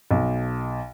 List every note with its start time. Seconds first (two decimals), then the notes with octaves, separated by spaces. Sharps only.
0.11 B1